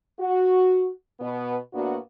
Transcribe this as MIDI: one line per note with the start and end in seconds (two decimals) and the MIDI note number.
0.19 0.89 66
1.20 1.56 47
1.20 1.56 59
1.73 1.96 45
1.73 1.96 58
1.73 1.96 59
1.73 1.96 62
1.73 1.96 66